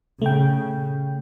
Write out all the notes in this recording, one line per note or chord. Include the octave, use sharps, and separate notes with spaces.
C#3 A3 G5